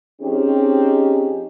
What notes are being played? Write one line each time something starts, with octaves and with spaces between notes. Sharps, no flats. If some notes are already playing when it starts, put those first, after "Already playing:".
F3 C4 C#4 D#4 G4 G#4